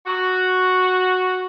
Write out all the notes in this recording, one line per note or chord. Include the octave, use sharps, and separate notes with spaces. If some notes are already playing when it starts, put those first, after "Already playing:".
F#4